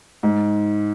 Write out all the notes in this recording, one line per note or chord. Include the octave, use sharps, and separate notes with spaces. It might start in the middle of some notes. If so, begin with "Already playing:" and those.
G#2